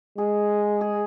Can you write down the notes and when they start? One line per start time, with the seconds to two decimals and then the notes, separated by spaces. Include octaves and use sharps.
0.18 G#3 G#4
0.81 G#4